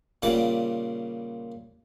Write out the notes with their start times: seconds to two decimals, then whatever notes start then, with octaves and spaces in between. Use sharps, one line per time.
0.23 A#2 C#3 G3 F#5 D6